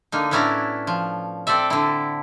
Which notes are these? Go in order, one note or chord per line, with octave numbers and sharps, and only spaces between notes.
D3 A#3 D#4
A2 B3 C#4 D4 E4 A#5
F3
C4 A4 D5 E5
D3 E4